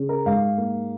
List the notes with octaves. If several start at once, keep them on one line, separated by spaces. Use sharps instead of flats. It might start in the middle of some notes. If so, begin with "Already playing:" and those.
Already playing: C#3
A#4
G#2 F5
A#3